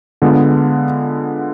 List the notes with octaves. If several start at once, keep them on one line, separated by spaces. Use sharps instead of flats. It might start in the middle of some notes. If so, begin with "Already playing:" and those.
D3 G#3 B3 F4